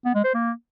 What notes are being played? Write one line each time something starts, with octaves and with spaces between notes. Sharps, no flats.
B3
G#3
C5
A#3